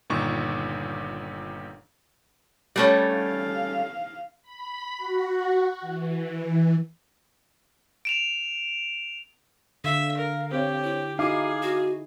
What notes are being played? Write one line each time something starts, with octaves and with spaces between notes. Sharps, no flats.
G1 A#2 D#3 C#6
G3 A3 C#4
F5
B5
F#4
E3
D7 E7 F7
D3 E5 F5
A#4
C4 G4 C#5
E4
D#4 E4 F#4 G#4 F5 D6
F#4